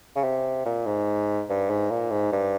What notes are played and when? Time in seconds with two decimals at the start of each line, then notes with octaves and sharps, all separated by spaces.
0.16 C#3
0.24 C3
0.66 A#2
0.86 G#2
1.49 G2
1.70 G#2
1.91 A#2
2.11 G#2
2.32 G2